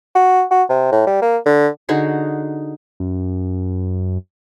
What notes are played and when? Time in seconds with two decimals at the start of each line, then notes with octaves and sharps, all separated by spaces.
0.15 F#4
0.51 F#4
0.69 C3
0.92 A2
1.07 G3
1.22 A#3
1.46 D3
1.89 D3 D#4 F#4 G#4
3.00 F#2